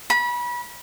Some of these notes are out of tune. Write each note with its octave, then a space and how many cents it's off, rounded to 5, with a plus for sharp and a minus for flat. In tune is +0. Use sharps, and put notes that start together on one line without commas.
B5 -30